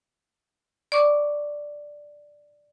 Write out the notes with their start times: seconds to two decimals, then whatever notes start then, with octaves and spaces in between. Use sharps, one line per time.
0.92 D5 C#6 D6